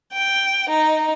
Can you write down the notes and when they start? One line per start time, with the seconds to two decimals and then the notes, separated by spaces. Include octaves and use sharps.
0.12 G5
0.69 D#4